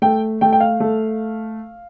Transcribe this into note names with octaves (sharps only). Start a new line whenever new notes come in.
A3 G5
A3 G5
G5
F5
A3